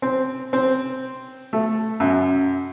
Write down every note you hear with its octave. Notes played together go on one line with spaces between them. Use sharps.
C4
C4
A3
F#2